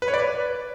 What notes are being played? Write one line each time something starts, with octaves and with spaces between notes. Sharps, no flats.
B4
C#5
D5
B4